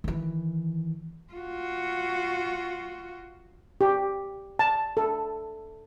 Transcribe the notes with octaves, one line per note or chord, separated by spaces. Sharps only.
D#3 E3
F4 F#4
G4
A5
A4